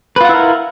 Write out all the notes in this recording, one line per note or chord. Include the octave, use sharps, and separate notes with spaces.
E4 F4 A#4 B4 F#5